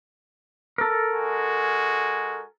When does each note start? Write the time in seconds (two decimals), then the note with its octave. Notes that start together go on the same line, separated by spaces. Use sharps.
0.78 A4 A#4
1.14 G#3 F#4 G#5